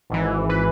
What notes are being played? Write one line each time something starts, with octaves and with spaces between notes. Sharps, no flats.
G#1 G#2 E3
E3 B4